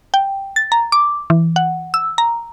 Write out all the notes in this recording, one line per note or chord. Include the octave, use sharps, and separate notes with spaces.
G5
A6
A#5
D6
E3
F#5
E6
A#5